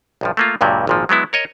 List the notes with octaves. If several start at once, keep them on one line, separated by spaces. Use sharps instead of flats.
B1 G2 F3
A3 A#3 F4
C#2 G2 A#2 F#3 G3
G#1 A#2 F3
F#3 G#3 B3 E4
A#4 C#5 D#5